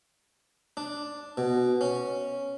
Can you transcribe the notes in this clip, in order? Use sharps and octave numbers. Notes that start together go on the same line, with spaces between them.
D4
B2
C#4